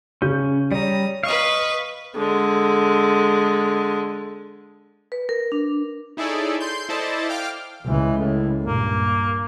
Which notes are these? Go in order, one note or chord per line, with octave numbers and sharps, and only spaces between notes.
C#3 C#4 G6
G3 C#5 A#5 D#6
B4 D#5 F5 C#6
D3 G#3
B4
A#4
D4
D#4 E4 G#4 A4 C#5 D5
C6 G6
E4 A4 C5 D5 D#5 A5
F5 G5 D6 F6
C#2 C#3 E3
A2
G2 A#2 A#3